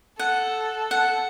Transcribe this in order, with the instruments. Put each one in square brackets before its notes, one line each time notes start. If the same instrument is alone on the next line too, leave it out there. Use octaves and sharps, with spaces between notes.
[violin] A4 [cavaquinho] F#5
[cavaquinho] F#5